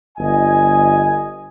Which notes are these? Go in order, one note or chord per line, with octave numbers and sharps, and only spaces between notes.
G1 D#5 G#5